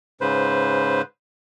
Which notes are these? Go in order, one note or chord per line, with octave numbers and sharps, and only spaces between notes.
G#2 C#3 B4 C5